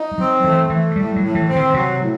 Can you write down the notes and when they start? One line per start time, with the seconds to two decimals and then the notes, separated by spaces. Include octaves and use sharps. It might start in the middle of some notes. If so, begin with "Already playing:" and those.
Already playing: D#4
0.11 G3
0.18 F#3 C4
0.44 E3 A3
0.70 E3 A3
0.96 A2 G3
1.16 F#3
1.23 A2
1.35 E3
1.49 C4
1.55 D#3
1.74 C3 F#3
2.01 A2